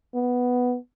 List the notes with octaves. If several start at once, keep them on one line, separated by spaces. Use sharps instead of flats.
B3